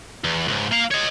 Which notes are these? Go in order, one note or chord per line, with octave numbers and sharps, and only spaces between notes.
E2
C#2 G#2
A#3 F5
C#5 D#5